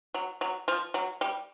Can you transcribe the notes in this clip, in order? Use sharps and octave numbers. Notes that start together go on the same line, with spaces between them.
F#3
F#3
F3
F#3
G3